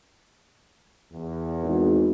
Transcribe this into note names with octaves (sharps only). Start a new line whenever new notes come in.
E2
G#1